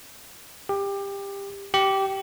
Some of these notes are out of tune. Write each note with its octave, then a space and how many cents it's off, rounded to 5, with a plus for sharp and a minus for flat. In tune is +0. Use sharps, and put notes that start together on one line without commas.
G4 +20
G4 -15